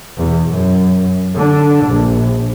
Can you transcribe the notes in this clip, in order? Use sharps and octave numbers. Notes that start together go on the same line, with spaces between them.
E2 B2
F#2
D3 D4
A#1